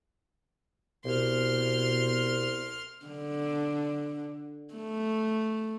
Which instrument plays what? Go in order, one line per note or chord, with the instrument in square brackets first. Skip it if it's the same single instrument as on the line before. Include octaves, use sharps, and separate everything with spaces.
[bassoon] C2 [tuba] B2 [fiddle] C6 F6
[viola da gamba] D3
A3